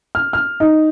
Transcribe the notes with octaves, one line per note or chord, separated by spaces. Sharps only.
F6
F6
D#4